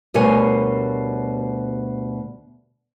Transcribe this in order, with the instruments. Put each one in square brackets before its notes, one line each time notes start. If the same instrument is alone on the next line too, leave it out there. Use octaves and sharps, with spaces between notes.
[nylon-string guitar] D2 B2 G3 A#4 C#5 G#5